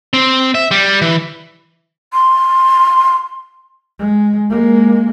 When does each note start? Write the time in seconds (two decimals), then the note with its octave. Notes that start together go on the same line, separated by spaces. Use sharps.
0.13 C4
0.55 E5
0.71 G3
1.02 E3
2.13 C6
3.99 G#3
4.50 G#3 A#3